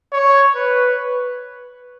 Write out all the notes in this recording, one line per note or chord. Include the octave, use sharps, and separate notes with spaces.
C#5
B4